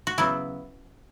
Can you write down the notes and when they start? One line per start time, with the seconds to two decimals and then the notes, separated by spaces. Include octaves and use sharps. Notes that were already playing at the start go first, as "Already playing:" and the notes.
0.07 F#4
0.18 C#3 F#3 B3 E4